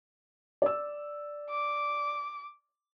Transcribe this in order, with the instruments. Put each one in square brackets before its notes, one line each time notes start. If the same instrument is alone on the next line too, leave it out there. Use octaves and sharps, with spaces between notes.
[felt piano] D5 E6
[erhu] D6